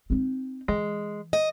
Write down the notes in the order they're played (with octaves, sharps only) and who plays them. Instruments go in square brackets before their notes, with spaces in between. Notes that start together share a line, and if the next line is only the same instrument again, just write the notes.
[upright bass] C4 D#4
[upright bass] E3 [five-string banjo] G#3
[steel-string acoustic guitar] D#5